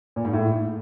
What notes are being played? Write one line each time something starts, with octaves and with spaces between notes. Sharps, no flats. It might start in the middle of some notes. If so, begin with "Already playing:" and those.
A#2
G#2
A2